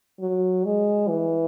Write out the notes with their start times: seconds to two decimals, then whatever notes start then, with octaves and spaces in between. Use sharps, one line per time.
0.20 F#3
0.65 G#3
1.08 E3